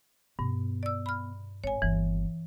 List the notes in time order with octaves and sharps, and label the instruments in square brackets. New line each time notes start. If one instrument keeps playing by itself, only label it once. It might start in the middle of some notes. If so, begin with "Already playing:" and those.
[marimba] G2 [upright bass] B2
[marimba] D5 E6
B5 F6
[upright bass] G#1 [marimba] C#5 G#5
[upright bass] G1 D#2 [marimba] E3